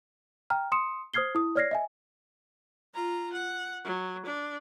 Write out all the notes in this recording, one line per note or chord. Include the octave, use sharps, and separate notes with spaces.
G5 A#5 F6
C6 D#6 C#7 E7
C5 D#6 F6 G#6 C7 G7
E4 D#6
C#5 D5 F6 G#6 A#6 C7
D#5 E5 G#5
F4 A#5
F#5
F#3
D4